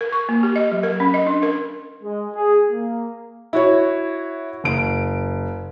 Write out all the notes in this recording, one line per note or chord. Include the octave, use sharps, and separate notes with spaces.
A#4
C#6
A#3
G4
D#5
F#3
A#4
C#4
D#5
D4
A#4
G#3
G#4
A#3
E4 F#4 C#5
F#1 D7